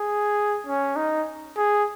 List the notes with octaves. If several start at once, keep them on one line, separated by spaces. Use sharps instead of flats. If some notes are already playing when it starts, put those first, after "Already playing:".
Already playing: G#4
C#4
D#4
G#4